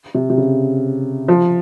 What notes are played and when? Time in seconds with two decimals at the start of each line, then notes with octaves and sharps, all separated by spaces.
0.15 C3
0.30 C3
0.38 C#3
1.28 F3